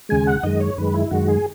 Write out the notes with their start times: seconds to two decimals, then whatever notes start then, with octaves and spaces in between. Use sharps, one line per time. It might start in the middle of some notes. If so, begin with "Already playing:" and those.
0.09 D#2 C#3 G#3 G#5
0.27 F#5
0.43 F#2 D#3 G#3 D#5
0.60 C#5
0.78 F#2 D#3 G#3 B4
0.94 E4
1.11 F#2 D#3 G#3 F#4
1.28 G#4